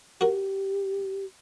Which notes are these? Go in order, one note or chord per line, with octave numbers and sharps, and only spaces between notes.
F#4 G4 A#4